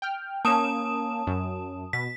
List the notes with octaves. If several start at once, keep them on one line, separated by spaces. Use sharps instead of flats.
G5 F6
A#3 C#4 A5 D#6 E7
F#2
B2 B6